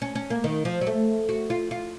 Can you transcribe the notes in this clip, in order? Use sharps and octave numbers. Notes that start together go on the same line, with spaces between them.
C#4
C#4
A#3
D#3
F3
F#3
A3
F#4
F4
F4